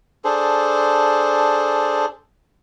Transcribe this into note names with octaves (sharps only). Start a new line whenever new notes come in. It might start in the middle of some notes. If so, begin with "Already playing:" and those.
D4 G#4 A4 C5